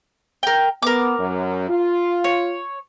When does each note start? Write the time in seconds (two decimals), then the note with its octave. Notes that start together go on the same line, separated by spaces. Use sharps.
0.43 A#4 G5
0.82 B3 A#4 D6
1.19 F#2
1.70 F4
2.24 C#5